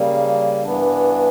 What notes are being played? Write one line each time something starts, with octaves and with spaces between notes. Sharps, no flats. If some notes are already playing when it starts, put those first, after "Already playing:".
Already playing: C#3 G3 A#3
G2 E3 B3 D4